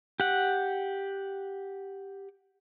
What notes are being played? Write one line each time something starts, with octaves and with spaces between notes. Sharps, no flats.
G4 F#5